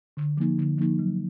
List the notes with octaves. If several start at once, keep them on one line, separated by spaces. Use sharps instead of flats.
D3
F3 A#3 D#4
D3
F3 A#3 D#4
F#3